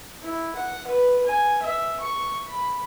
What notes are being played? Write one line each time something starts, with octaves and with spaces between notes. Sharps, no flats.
E4
F#5
B4
G#5
E5
C#6
B5